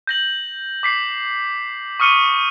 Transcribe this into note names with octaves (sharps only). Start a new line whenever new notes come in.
G6 A#6 F#7
D6 B6 C7
C#6 D#6 F6 C#7 D#7 G7